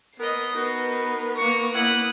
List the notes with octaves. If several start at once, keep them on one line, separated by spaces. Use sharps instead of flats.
B3 A#4 D#5 C7
B3 D#4 F#4 A#4 B4
A#3 C#6 A#6
A#3 E4 F#5 D#6 F#6